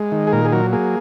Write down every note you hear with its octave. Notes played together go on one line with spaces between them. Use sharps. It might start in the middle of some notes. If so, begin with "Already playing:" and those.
Already playing: G#3
D#3
G#4
A#2 A#4
G#4
F#3 A#4
A#3 G#4